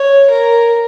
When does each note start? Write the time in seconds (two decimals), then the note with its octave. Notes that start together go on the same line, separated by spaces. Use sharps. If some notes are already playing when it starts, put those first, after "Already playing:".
Already playing: C#5
0.30 A#4